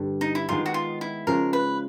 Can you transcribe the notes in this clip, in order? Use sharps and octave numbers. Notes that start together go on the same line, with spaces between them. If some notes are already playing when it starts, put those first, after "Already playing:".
Already playing: G2 D3 G3
D#4
E4
D#3 G#3 B3 D#4 F4
F#4
F4
E4
C#3 F3 G#3 A#4
B4